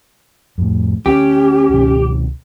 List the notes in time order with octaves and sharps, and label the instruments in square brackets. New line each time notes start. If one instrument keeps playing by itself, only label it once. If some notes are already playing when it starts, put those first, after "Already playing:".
[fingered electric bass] F2 A2
[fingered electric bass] D2 [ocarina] C#4 [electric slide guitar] G4
[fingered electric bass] C#2 B2 D#3